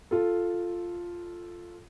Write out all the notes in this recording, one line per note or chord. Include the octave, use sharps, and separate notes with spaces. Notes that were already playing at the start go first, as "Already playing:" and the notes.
F4 A4